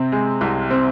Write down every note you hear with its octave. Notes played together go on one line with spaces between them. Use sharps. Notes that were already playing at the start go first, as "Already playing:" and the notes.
Already playing: C3 C4
G#3
C2
C4